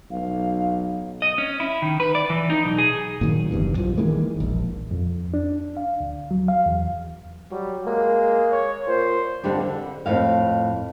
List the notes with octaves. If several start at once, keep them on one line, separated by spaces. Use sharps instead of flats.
B1 F5
D#5
C#4
E4
D#3
B4
D5
E3
D#4
B1
G#4
A#2 D#3 F#3
F#1 E2 G2
A#1 F#2 F3
D#3 E3 G#3 A#3
E1 A#1
F2
D4
F5
D2
F#3
F5
E2
F#3 G3
G#3 A#3
C#5
A#2 C5
F2 D3 E3 G3 D4
D3
F2 A2 E3 F5